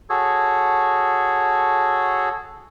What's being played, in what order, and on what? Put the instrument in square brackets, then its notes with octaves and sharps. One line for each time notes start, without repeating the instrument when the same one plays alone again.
[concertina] F#4 G#4 A4 C#5